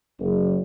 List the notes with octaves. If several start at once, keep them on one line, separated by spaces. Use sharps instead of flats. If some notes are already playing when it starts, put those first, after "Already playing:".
F#1